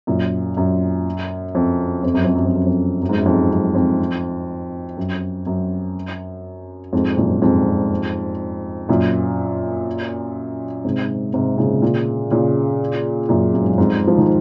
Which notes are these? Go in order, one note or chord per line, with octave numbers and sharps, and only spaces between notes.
F#2 A#2
F#2
F2
F2
F#2
F2
F#2
F2
F#2
F2
F#2
G#2
F#2
F2 G#2
F#2
F2
F#2
F#2
F2 G#2
F#2 A#2
F2 G#2
F#2 A#2
G#2 C3
G#2 C3
A#2 C#3
A#2 C#3
A#2 C#3
F#2 A#2
F#2
G#2
F#2
F2 G#2
F3
D#3